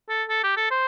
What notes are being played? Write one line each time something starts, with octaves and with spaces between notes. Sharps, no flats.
A4
A4
G4
A4
C5